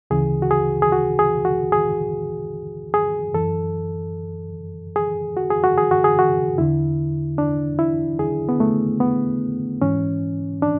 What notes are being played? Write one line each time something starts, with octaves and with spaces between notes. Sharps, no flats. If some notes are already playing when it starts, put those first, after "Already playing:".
D2 C#3 E3 G#4
F#4
G#4
G#4
F#4
G#4
F#4
G#4
G#4
F#2 E3 A4
G#4
F#4
G#4
F#4
G#4
F#4
G#4
F#4
E2 D3 E4
D4
E4
G#4
B3
A3
B3
G#2 E3 C#4
D4